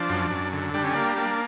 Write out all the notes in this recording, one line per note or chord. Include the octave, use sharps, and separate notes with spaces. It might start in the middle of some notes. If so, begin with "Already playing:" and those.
Already playing: F3 D4
F#2
F#2
D3
G3 D4
C#4
A#3 D4
A#3